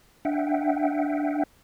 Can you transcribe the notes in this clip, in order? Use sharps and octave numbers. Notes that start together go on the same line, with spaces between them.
D4 E5 F#5 G5